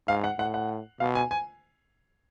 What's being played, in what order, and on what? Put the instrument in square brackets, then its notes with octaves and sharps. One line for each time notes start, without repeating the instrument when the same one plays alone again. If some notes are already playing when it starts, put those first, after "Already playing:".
[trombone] G#2 [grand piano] F5
[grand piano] F#5
[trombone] A2 [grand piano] F#5
[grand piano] F#5
[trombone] B2 [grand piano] F5
[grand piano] G#5
G#5